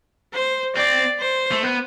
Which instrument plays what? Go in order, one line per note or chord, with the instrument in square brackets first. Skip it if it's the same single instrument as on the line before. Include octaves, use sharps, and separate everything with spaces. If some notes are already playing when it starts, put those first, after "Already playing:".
[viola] C5
[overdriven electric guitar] C4 [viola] D5
[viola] C5
[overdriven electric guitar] A3
B3